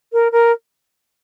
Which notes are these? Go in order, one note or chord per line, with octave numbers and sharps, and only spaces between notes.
A#4
A#4